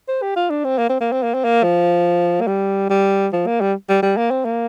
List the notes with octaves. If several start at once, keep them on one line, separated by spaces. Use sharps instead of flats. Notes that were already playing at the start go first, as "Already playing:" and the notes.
C5
G4
F4
D4
C4
A#3
C4
A#3
C4
A#3
C4
A#3
F3
A#3
G3
G3
F3
A#3
G3
G3
G3
A#3
C4
A#3